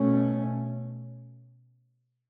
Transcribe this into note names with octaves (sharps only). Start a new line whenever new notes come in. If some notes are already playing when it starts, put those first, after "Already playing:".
Already playing: B2 A3 C#4